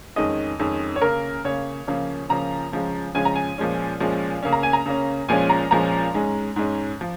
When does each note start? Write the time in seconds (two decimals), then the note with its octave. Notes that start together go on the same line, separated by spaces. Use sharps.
0.16 F2 D#3 G#3 C#4 D#5
0.59 F2 D#3 G#3 C#4
0.96 C#5
1.02 C#3 A#3 C#4 A#4
1.45 C#3 A#3 C#4 C#5
1.87 C#3 F3 A#3 C#4
2.29 C#3 F3 A#3 C#4 A#5
2.72 C#3 F3 G#3 C#4
3.14 C#3 F3 G#3 C#4 G#5
3.25 A#5
3.35 G#5
3.58 A#2 F3 G#3 C#4
4.00 A#2 F3 G#3 C#4
4.43 C#3 A#3 C#4
4.53 A#5
4.63 G#5
4.73 A#5
4.86 C#3 A#3 C#4
5.29 A#2 F3 G#3 C#4 G#5
5.50 A#5
5.71 A#2 F3 G#3 C#4 A#5
6.14 G#2 G#3 C#4
6.56 G#2 G#3 C#4
7.01 F3